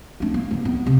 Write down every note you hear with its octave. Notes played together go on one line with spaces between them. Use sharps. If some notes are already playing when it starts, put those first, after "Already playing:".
A3 D4
A#3
D3 E3
D#2 B3
C3 C4